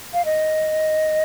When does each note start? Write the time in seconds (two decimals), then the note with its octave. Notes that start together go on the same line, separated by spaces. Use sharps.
0.14 F5
0.25 D#5